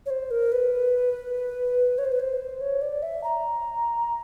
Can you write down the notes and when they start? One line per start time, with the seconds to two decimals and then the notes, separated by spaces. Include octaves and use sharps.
0.06 C#5
0.10 C5
0.31 A#4
0.52 B4
1.98 C#5
2.05 C5
2.12 B4
2.20 C5
2.61 C#5
2.82 D5
3.02 E5
3.24 A#5